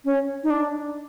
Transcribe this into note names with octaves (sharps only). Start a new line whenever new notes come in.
C#4
D#4
D4